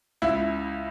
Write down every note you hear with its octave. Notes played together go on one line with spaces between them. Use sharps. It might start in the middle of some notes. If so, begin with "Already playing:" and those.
C#2 E4